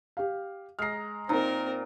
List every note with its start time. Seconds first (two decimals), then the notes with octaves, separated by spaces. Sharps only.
0.17 G4 F5
0.79 G#3 A#5 F6 C7
1.29 A#2 C4 D#4 A#4 A#5